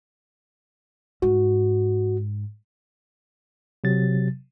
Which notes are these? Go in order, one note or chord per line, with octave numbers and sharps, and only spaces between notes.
G#2 F#4
C3 F#3 A6